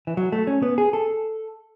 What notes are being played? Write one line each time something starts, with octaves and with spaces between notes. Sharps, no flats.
E3
F#3
A3
C#4
B3
G#4
A4